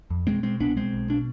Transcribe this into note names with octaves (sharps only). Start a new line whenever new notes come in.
F2
B2 G#3 C4
B2 G#3 C4
C2 B3 D4
B2 G#3 C4
B1
B2 D4